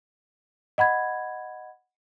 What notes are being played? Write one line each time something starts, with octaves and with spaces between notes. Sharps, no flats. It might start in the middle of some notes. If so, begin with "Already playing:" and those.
D#5 F#5 B5 G#6